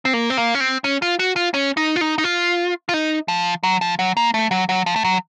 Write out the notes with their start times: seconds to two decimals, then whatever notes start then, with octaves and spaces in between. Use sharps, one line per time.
0.05 C4
0.13 A#3
0.30 C4
0.37 A#3
0.55 C#4
0.60 C4
0.84 C#4
1.02 F4
1.19 F#4
1.36 F4
1.54 C#4
1.77 D#4
1.96 F4
2.01 D#4
2.18 D#4
2.24 F4
2.89 F4
2.94 D#4
3.28 F3
3.63 F#3
3.81 F3
3.99 F#3
4.17 A#3
4.34 A3
4.51 F#3
4.69 F#3
4.86 F3
4.96 A3
5.04 F#3